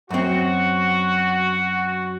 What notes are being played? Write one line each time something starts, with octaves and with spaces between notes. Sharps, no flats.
F#2 C4 F#4